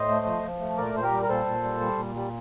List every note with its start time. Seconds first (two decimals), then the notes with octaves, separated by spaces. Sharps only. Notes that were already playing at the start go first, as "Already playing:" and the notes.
Already playing: A2 C5 D#5
0.09 A3
0.26 F3
0.43 F3
0.60 A3
0.77 A#2 A#4 D5
0.94 A#2 C5
1.03 G4 A#4
1.12 G3
1.23 A#4
1.29 A#2 A4 C5
1.46 A#2
1.63 G3
1.80 G3
1.97 A#2
2.15 G3